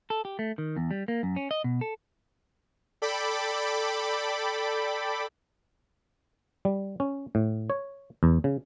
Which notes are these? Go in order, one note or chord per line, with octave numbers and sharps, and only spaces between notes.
A4
G4
A3
D#3
E2
G3
A#3
F#2
C#4
D#5
B2
A4
A4 D5 G5 B5 D6
G3
C#4
A2
C#5
E2
C#3